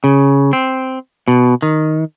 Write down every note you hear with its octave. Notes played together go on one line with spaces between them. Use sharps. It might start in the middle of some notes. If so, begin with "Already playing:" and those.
C#3
C4
B2
D#3